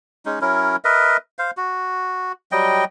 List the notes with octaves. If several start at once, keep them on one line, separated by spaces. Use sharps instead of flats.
G#3 C#4 D#4
F#3 C#4 E4 A#4
A#4 B4 D#5 E5
C5 F5
F#4
F#3 G3 D#5 G5